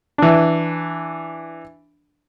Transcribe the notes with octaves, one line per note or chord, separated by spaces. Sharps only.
E3 D4